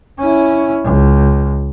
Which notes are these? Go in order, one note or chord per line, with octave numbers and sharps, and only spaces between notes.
C#4 E4
C#2